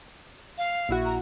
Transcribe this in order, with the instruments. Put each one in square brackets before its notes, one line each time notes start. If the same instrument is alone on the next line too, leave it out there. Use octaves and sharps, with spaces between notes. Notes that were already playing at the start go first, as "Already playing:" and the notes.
[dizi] F5
[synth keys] A#1 E4 F#4
[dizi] A#5